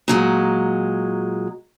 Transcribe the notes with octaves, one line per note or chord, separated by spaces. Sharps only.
A#2 F#3 G#3